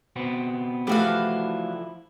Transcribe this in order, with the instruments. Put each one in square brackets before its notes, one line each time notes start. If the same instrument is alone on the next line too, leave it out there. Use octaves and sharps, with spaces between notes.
[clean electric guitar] B2 B3 C4
[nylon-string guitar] E3 A3 G4 [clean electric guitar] F3 E4 [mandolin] D4 F#4 F5